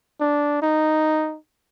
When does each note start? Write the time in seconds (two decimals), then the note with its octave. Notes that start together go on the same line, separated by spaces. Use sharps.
0.20 D4
0.62 D#4